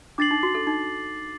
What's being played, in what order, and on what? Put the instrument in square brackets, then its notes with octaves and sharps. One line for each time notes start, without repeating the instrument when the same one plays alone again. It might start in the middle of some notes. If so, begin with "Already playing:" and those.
[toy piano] D4 [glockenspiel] D6 A6 C7 F#7
[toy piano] D#4
F#4
A4
D#4